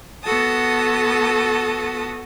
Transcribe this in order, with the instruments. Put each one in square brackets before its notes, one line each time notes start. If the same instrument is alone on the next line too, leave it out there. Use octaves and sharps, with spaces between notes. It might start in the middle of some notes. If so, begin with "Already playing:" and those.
[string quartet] B3 F#4 A4 A5 D#6